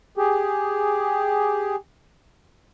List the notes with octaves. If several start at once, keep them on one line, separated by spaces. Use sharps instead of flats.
G4 G#4